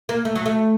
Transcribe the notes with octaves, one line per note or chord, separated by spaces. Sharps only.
A#3
A3
F#3
A3